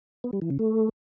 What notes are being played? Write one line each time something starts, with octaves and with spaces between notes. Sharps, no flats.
B3
G3
E3
C#3
A3